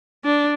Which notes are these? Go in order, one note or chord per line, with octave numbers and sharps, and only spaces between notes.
D4